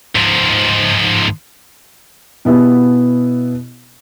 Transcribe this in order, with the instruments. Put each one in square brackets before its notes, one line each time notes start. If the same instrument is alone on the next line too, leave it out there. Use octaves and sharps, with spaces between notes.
[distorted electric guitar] G#2 F3
[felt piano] B2 B3 E4 G4